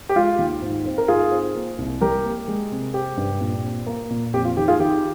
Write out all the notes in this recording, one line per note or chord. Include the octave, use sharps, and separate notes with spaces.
G4
G#3 F4
D#2
G#2
C4
A#4
G#2 F4 G#4
C4
A#3
C2
G3 G4 A#4
A#3
G#3
C3
C4 G4
G2
A#2
C4
A#3
A#2
F2 G4
F4
D#3 G4
F4 G#4
D#3 G4